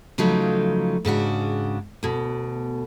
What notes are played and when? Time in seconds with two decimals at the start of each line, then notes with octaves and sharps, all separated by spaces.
0.18 C#3 F3 F#3 A3 D#4
1.05 G#2 C#3 D4 F#4
2.03 D2 B2